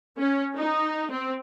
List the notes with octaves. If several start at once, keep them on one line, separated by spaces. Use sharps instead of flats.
C#4
D#4
C4